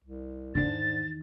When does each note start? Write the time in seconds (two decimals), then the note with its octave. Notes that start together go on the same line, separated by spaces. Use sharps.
0.04 C2
0.55 E2 G#2 D3 D#3 D4 A6